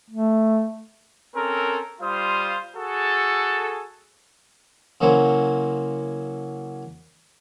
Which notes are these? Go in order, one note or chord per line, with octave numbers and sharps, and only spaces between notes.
A3
C4 C#4 A4 A#4
G3 F4 C5 F5 D#6
F#4 G#4 A4
C#3 F#3 A#3 C#4 E4 C5